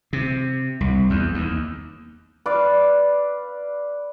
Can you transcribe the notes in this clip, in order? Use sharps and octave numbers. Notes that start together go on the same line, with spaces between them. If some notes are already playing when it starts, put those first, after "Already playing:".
C3
C2
E2
D#2
B4 D5 F5